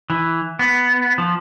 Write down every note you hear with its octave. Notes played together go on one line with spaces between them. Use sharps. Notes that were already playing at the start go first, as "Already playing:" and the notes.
E3
B3
F3